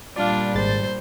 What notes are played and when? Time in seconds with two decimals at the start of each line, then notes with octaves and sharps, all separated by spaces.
0.16 A#2 G3 D4 F4 D5 F5
0.55 G#1 G#3 C5 A6